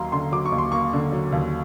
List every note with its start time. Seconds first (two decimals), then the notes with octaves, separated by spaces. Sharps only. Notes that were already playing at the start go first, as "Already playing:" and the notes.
Already playing: D#2 F#3 A#3 A#5 C6
0.12 D3 C6
0.32 F#3 D6
0.45 C#6
0.52 D#2
0.58 C6
0.72 A#3 C#6
0.93 D3
1.12 F#3
1.32 D#2